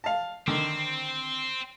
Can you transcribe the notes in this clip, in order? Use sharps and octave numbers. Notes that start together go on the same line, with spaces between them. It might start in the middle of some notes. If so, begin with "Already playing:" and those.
F5 A5
D3 D#3 C4